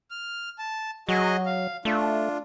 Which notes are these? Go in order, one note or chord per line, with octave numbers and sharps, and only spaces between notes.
F6
A5
F#3 F#4 G#4 D#5
F5
A3 D4 F4